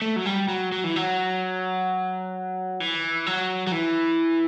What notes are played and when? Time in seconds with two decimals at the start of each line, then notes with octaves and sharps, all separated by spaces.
0.02 A3
0.16 F#3
0.26 G3
0.48 F#3
0.72 F#3
0.84 E3
0.96 F#3
2.80 E3
3.26 F#3
3.67 F#3
3.72 E3